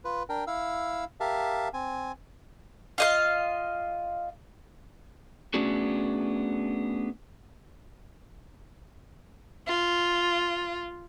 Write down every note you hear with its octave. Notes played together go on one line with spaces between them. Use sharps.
F4 B4
D4 A#4 G5
E4 F5 E6
G4 A#4 E5 F5 A5
C4 G#5
F4 D#5 F5
A3 B3 C#4 D4 F#4 G#4
F4